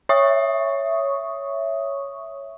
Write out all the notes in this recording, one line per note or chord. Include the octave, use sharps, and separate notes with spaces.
C#5 E5 C#6 D#6